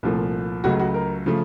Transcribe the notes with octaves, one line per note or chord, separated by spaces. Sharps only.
C2 A#2 F3 A3
C#2 C#3 F#3 A3 F#4
F#4
A#4
C#3 F3 A3